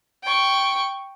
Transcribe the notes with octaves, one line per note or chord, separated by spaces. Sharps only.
G5 C#6